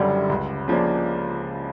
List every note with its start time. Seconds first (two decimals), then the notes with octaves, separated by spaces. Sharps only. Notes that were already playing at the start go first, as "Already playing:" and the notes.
Already playing: F#1 F#2 D3 G3
0.29 C#2
0.68 C#3 F3 A#3 D4